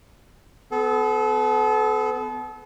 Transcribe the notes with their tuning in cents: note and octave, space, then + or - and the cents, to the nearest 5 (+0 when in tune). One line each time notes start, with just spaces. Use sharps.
B3 +30 A4 -30